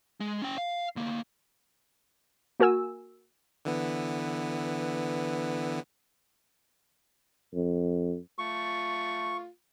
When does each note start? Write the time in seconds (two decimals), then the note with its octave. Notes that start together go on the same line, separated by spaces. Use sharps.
0.20 G#3
0.42 C#4 G5
0.58 F5
0.96 D2 A#3
2.60 A#3 F#4 A#4 G#5 E6
3.65 D3 E3 B3
7.54 F2
8.38 A3 F4 C#6